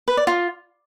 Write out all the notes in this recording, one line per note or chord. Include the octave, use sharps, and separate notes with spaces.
B4
D5
F4